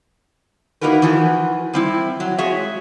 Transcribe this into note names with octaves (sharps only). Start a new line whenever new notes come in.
A#3 D#4 E4 F#4 A#4 B4
E3 F3 F#4
G3 C4 E4
F#3
G#3 F#4 G#4 C#5 E5